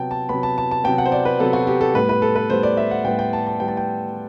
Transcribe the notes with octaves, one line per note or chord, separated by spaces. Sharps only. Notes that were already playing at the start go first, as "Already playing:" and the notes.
Already playing: C3 F#3 B3 G5 A5
A5
C3 F#3 B3 B5
A5
A5
A5
C3 F#3 B3 G5
F#5
C5
D5
B4
C3 F#3 B3 A4
F#4
G4
A4
A2 G3 B3 B4
B4
A4
B4
A2 G3 B3 C5
D5
E5
F#5
A2 G3 B3 G5
G5
A5
A5
A2 G3 B3 G5
A5
G5